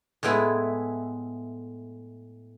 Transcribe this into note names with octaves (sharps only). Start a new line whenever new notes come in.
A2 G#3 B3 E4